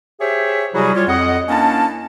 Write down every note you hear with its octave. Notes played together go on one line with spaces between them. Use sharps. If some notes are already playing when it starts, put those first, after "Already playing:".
G4 G#4 C5 C#5 E5
C3 F#3 G3 E4 F#4 G#4
G3 F4 C#5
F2 D#5 F#5
A#3 C#4 D4 E4 A5